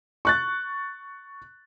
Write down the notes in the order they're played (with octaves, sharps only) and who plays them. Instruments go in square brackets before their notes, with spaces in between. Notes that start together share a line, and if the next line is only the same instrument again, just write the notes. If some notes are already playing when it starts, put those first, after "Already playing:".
[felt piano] C#6 F#6 A6